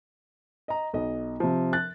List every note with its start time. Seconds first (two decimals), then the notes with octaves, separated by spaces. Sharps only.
0.68 D#5 A#5
0.94 B1 D#5
1.40 C3 F3
1.73 F#6 A6